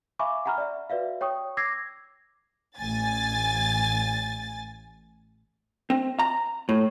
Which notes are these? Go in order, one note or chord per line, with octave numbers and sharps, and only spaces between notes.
E5 F5 G#5 B5 C#6 D6
F#5 G#5 A#5 B5 F6
D5 E5
F#4 B4 D5 E5 F5
C#5 G5 C#6 D#6
D6 E6 G#6 A#6 C7
A1 G#5 A6
C4
A#5
A2